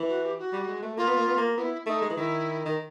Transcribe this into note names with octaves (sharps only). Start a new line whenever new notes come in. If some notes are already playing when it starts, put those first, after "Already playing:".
Already playing: E3
F#4
G4
F#4
G3
G#3
A3
A#3 F4
B3
A#3
B3
A#3
B3 E4 F4
A3 D#4
G#3
E3
D#3 E4
D#3